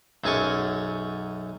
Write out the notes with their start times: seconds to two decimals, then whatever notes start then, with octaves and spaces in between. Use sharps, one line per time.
0.24 B1 F#2 G#4 G#5 A5 C#6